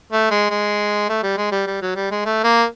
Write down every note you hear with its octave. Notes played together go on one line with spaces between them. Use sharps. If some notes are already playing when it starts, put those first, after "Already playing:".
A3
G#3
G#3
A3
G3
G#3
G3
G3
F#3
G3
G#3
A3
A#3